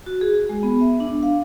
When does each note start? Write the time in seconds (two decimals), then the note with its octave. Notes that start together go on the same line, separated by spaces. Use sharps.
0.06 F#4
0.21 G#4
0.49 G#3
0.63 B3
0.81 E5
1.00 D4
1.23 F5